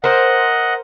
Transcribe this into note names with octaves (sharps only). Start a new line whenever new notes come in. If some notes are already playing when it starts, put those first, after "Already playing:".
A#4 C5 D#5 F#5